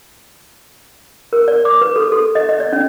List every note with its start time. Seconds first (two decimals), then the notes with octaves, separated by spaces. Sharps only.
1.33 A#4
1.48 D5
1.65 D6
1.81 B4
1.96 A4
2.12 A4
2.35 D#5
2.49 D#5
2.60 D5
2.73 C#4